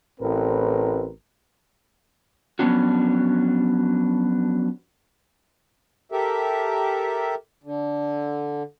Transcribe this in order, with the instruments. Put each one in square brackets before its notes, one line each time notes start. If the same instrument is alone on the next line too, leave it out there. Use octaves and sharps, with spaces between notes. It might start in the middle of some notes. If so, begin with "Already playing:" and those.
[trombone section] A1 A2 C4 A#4 B4
[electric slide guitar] F3 F#3 B3 C#4 D4 F#4
[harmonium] G4 A4 A#4 E5
D3